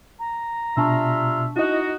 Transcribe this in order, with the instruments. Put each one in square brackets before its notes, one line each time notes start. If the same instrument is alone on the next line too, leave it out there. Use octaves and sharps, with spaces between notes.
[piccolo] A#5
[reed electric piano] B2 [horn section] G3 F4 E5 [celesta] D4 A5 C#6
[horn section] D#4 F#4 [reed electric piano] E4 D#5